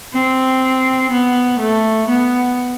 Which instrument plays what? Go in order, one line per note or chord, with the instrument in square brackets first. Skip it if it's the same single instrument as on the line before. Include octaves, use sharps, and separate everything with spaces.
[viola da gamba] C4
B3
A3
B3